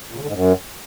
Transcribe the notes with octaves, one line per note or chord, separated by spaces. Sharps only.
A#2
C#3
D3
G#2
F#2